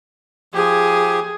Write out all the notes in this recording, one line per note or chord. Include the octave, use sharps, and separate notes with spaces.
F3 G4 G#4